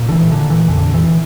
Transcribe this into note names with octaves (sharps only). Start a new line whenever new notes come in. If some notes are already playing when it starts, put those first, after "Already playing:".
Already playing: A#2
D3
E3
A#2 D3
E3
F2 D3
E3